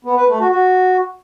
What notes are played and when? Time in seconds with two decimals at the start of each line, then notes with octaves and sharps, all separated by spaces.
0.05 B3
0.16 B4
0.28 A3
0.40 F#4
0.52 F#4